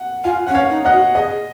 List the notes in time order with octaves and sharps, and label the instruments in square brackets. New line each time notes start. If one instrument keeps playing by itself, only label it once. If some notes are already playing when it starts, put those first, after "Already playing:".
Already playing: [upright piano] F#5
[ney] F4 [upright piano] F5 G#5
[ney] C#4 [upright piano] F#5
[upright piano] C#5 F5
[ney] D#4
[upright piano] D#5 F#5
[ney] F#4
[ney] G#4 [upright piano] D#5